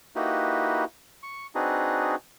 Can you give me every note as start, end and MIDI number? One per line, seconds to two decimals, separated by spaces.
0.16 0.84 58
0.16 0.84 63
0.16 0.84 64
0.16 0.84 66
0.16 0.84 67
0.16 0.84 71
1.23 1.47 85
1.55 2.15 60
1.55 2.15 62
1.55 2.15 63
1.55 2.15 66
1.55 2.15 68
1.55 2.15 71